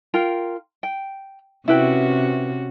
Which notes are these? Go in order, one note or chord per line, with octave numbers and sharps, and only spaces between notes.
F4 A#4 G5
G5
C3 C#4 E4 F#4 B4 G5